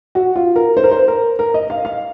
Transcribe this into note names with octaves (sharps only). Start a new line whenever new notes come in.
F#4
F4
A#4
C5
A#4
C5
A#4
A#4
D#5
F5
F5